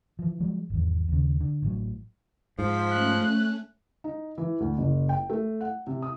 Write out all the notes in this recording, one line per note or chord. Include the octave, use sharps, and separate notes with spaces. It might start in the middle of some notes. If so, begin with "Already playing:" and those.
E3 F3
F3 F#3 G#3
G#1 E2
D#2 C#3
D3
A1 A2 F#3
G#2 F3 C5 B6
A3 C#4 F#6
D#4
E3
D2
F#1
G5
A3
F#5
C3
D#6